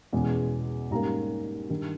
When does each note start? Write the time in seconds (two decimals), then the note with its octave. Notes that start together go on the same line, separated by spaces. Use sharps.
0.13 E2 B2 G#3 C#4
0.91 G#2 G3 A#3 C#4 A#5
1.70 G2 D#3 G3